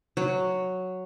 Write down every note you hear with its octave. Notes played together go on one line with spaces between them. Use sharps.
F#3